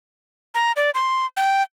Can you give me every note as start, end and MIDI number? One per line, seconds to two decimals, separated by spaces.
0.55 0.72 82
0.76 0.90 74
0.94 1.26 84
1.37 1.63 79